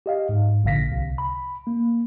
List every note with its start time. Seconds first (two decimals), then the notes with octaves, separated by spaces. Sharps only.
0.06 G4 D#5 F5
0.29 G#2
0.64 A#1 A#2 D3 F5 A#6 B6
0.91 C2 C3
1.18 B5
1.67 A#3